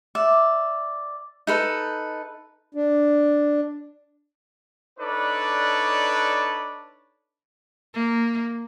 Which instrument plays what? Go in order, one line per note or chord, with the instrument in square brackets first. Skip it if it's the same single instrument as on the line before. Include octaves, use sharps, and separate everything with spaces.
[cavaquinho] D5 E5
D#4 A4 B4
[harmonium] D4
[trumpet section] D4 D#4 A4 B4 C#5 D5
[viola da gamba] A#3